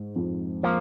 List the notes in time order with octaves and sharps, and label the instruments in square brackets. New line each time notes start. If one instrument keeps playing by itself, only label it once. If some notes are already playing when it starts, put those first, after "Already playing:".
Already playing: [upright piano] G#2
F2
[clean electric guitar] F3 A#3